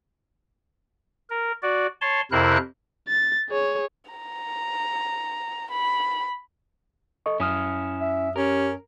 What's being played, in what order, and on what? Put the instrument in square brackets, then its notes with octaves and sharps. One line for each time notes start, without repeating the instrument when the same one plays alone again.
[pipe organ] A#4
F#4 D5
C#5 A5 C6
F2 C3 E4 A#4 C5 F#6
[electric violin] A6
G#4 C#5
[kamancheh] A#5
B5
[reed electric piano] A4 D#5 C#6
[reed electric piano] F#2 D#6 F6 [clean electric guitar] C#4 E4
[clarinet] E5
[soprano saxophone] C#4 [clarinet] G4 [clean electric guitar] A#4